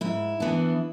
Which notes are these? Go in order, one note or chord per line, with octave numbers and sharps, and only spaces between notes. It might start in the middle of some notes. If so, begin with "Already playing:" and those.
G#2 E4
E3 B3 D4